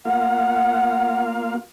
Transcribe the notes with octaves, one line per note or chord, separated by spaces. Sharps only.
A#3 F4 F5 F#5